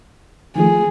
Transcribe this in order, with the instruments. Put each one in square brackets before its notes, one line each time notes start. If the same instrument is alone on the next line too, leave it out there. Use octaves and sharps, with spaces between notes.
[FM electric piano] D#3 F3 A3 [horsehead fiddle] G#4